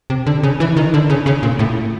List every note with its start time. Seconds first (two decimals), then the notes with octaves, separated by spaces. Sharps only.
0.10 C3
0.26 D3
0.43 C#3
0.60 E3
0.77 D#3
0.94 D3
1.10 C#3
1.26 C#3
1.43 A#2
1.59 A2